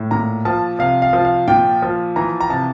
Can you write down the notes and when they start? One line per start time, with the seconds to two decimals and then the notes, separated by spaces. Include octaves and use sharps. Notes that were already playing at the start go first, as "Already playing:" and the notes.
Already playing: A2
0.11 A#2 A#5
0.45 F3 A5
0.79 C3 F5
1.02 F5
1.13 F3
1.25 F5
1.48 A#2 G5
1.82 F3
2.16 E3 A#5
2.40 A#5
2.50 C3 A5